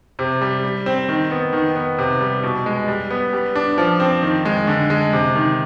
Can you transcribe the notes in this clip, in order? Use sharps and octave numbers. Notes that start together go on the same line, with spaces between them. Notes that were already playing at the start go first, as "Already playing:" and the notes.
C3
G3
G3
C4
D#3
B3
D#3
B3
C3
G3
B2
G#3
G3
B3
G3
D4
F3
C4
D#3
G#3
D3
G#3
C3
D#3